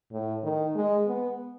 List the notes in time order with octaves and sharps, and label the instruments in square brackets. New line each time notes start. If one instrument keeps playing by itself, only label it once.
[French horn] A2
D#3
G#3
B3